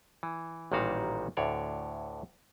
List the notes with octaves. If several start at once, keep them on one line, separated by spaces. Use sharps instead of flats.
E3
A1 A#2 D#3 G3 F#4 F5
D2 A2 D3 C#5 D5